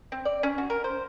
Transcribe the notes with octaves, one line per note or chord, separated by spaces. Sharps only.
C4
D5
C#4
F#4
A#4
C5